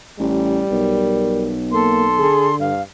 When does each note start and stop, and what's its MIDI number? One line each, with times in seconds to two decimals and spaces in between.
0.19 0.63 33
0.19 1.52 55
0.71 2.27 35
0.71 1.53 70
1.71 2.05 58
1.71 2.54 69
1.71 2.54 84
2.19 2.71 50
2.19 2.49 68
2.59 2.81 43
2.59 2.80 77